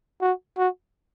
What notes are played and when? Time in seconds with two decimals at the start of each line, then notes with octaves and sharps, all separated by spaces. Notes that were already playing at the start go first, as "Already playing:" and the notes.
0.21 F#4
0.57 F#4